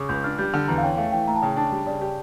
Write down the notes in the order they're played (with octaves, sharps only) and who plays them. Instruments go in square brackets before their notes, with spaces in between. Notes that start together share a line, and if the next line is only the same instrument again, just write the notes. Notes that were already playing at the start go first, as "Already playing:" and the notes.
Already playing: [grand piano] C#3 [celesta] C#6 D6
[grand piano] C#2 [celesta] G6
[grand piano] D4 [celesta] F6
[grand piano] G3 [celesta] G6
[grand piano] D3 [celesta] F6
[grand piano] E2 [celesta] A#5
[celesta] F5
[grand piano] C#4 [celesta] G5
[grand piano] A3 [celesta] F5
[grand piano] E3 [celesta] G5
[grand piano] A2 [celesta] A#5
[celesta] A5
[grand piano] C#3 [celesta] G5
[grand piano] D4 [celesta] A5
[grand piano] G3
[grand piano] C#3 [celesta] D5
[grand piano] G4